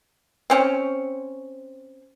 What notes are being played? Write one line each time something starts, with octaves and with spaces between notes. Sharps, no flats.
C4 C#4